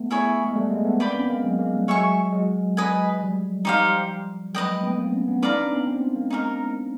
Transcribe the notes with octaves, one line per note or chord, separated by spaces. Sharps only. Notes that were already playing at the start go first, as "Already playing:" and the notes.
Already playing: A3 B3
E4 G#4 C#5 E5
G#3
G3 A3
G#3 A#3
A3 B3
A#3 C4 B4 D5 G5 B5
B3 C#4
G#3 A#3
F#3 G#3
G#3 A#3
G3 A3
F#3 G#3 C#5 E5 G#5 C#6
F#3 G#3
B4 D#5 G#5
F3 G3
F3 G3 D#4 G4 C5 F5
F#3 G#3 B4 D#5 G5
G#3 A#3
A3 B3
A#3 C4
B3 C#4
B3 C#4
C#4 D#4 B4 D5 F5 A#5
C4 D4
B3 C#4
A#3 C4
G#3 A#3
D#4 G4 A#4